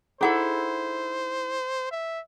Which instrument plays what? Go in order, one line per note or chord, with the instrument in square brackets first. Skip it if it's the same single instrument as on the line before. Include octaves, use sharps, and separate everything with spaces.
[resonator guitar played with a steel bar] D#4 E4 A4 [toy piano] G#4 F#5 C#6 [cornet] C5
[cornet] E5